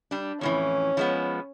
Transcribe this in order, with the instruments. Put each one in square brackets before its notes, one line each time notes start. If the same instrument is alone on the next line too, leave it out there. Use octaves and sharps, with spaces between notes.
[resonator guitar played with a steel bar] G3 D4
[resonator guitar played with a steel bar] F2 A2 E3 [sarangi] C#4
[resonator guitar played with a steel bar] F3 G#3 B3